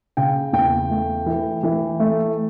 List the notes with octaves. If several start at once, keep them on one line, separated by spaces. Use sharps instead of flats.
C#3 G5
E2 G5
A3
E3
E3
A3